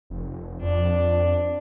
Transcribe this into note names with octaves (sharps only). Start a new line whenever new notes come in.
F1
F2 D4